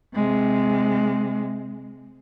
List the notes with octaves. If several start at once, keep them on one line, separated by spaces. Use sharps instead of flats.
C3 G#3